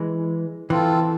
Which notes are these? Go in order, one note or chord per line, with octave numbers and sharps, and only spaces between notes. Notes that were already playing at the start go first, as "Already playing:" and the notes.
Already playing: E3 G#3
E3 C4 F4 A4